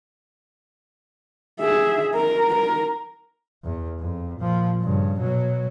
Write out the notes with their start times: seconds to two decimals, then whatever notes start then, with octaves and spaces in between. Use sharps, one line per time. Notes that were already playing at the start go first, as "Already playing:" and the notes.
1.60 G#4 E5
2.15 A#4
2.54 A#4
3.64 E2
3.99 F2
4.40 A#2 F3
4.81 G2 C#3
5.20 B2 F#3